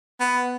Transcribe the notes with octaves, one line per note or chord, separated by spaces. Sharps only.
B3